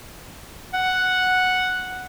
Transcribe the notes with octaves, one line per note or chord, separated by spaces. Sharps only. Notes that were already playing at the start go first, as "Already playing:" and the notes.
F#5